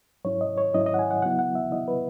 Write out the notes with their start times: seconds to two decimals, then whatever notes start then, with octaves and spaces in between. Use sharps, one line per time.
0.25 G#2 F#3 C#4 E4 C#5
0.41 D#5
0.57 C#5
0.74 G#2 F#3 C#4 E4 D#5
0.86 D#5
0.94 F#5
0.99 G#5
1.11 F#5
1.22 C#3 F#3 B3 E4 F#5
1.39 F#5
1.55 E5
1.71 C#3 F#3 B3 E4 D#5
1.88 B4